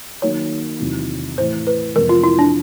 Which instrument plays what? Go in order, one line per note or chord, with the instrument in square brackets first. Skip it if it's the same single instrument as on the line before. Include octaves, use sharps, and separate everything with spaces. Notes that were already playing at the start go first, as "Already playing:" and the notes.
[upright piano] D#3 F#3 A#3 D#4 [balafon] C#5
[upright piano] E2 C3 D#3 F#3
[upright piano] A2 E3 A3 [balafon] C5
[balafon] B4
[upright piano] F2 C3 E3 G#3 B3 [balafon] A#4
[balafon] F4
E4
D4